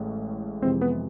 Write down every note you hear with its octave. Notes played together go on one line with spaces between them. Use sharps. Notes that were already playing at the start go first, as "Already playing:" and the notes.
Already playing: A1 A2 G#3
F2 C3 E3 G#3 C4 C5
B3 B4